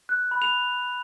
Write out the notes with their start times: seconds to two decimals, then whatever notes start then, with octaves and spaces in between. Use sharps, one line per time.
0.09 F#6
0.31 B5
0.42 F7